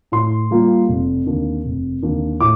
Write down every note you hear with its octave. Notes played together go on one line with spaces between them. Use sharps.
A2 C6
G3 A#3 F4
F1
D#2 D3
F1
D#2 D3
A2 D6